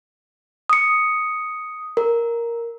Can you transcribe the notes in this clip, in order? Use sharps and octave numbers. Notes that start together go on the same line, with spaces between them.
D#6 C#7
A#4